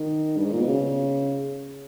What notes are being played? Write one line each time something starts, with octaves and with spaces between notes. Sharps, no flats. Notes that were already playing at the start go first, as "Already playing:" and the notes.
Already playing: D#3
G2
G#2
A#2
B2
C#3